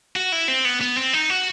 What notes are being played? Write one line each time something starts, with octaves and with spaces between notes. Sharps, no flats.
F#4
E4
C4
B3
B3
C4
D#4
F#4